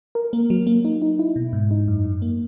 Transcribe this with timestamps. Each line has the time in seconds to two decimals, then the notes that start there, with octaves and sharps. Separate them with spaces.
0.15 A#4
0.33 A#3
0.50 F#3
0.67 A#3
0.85 D#4
1.02 D#4
1.19 E4
1.36 B2
1.53 G#2
1.71 D#4
1.88 F#2
2.05 F#2
2.22 A#3